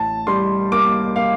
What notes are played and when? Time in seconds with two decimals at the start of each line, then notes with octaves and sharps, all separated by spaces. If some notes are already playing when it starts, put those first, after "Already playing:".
Already playing: A1 A5
0.27 G3 C6
0.72 A#3 D6
1.16 A#3 F5